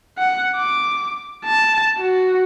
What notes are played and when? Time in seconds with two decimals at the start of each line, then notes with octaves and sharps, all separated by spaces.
0.18 F#5
0.57 D6
1.45 A5
1.99 F#4